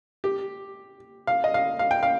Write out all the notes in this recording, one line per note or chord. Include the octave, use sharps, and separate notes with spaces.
G4
F5
D#5
F5
F5
G5
F5